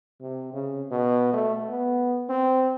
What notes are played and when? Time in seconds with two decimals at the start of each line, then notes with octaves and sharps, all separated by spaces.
0.21 C3
0.53 C#3
0.91 B2
1.33 A3
1.69 B3
2.29 C4